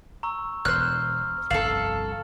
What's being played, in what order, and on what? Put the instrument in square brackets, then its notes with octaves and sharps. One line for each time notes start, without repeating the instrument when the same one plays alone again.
[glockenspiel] A#5 C#6 E6
[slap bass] E1 [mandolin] C5 F#6 [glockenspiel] F6
[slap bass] G1 C2 F2 [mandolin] A4 F5 [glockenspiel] A6 E7 F#7